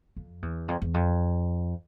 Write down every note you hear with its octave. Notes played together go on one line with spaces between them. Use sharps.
F2
E2
F2
E2
F2